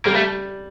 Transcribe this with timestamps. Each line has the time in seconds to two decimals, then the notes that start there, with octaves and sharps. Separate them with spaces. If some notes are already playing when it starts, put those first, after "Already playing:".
0.06 G3 A#3
0.15 A3